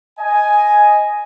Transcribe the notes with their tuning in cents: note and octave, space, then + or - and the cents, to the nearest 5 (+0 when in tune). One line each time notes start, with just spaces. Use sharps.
D#5 +0 G#5 +5